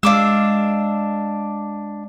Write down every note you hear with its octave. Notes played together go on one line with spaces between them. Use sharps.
G#3 D4 F5 D6 E6